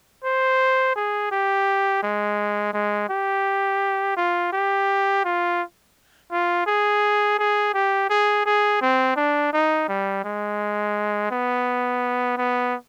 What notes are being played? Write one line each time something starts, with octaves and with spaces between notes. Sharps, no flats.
C5
G#4
G4
G#3
G#3
G4
F4
G4
F4
F4
G#4
G#4
G4
G#4
G#4
C4
D4
D#4
G3
G#3
B3
B3